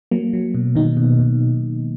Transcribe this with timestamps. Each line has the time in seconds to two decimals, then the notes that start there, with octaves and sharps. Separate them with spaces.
0.11 F#3 A#3
0.33 F#3
0.55 B2
0.75 B2 D#3 D#4
0.97 B2
1.19 B2